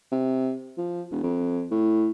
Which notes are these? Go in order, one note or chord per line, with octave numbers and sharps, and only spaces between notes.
C3
F3
E1
F2
A2